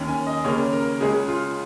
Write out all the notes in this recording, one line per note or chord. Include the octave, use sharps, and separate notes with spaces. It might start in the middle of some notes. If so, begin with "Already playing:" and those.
Already playing: D#2 D#3 C#4
G#5
D#5
D#2 C#3 A#3 C#4 C#5
A#4
C#2 C#3 G#3 C#4 G#4
F4